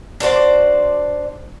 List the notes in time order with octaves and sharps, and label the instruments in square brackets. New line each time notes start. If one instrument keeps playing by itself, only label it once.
[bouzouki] D4 F#4 C5 D5